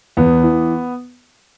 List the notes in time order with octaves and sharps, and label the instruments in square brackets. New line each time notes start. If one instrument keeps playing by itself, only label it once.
[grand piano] E2 B3
E3